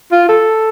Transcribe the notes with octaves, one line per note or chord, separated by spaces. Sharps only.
F4
A4